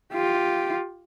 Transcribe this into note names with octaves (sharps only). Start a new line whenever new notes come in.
F4 G4